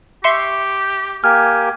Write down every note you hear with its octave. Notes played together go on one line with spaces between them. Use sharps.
G4 E5 C6 C#6
A#3 G4 G#5 F6